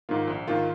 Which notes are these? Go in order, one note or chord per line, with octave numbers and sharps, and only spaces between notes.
G#2 D#3 A#3 F4
A#1
G#2 D#3 A#3 F4